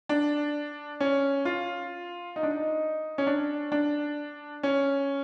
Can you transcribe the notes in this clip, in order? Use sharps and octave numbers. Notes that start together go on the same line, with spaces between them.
D4
C#4
F4
D#4
D4
D#4
C#4
D4
D4
C#4